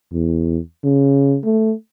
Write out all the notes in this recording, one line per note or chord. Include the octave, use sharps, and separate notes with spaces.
E2
C#3
A3